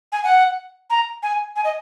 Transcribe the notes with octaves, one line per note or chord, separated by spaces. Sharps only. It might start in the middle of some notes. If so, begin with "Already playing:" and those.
G#5
F#5
A#5
G#5
G#5
D#5